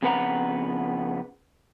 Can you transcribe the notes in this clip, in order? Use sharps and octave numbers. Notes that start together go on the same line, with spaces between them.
F2 C#3 B3 B4 F#5 A#5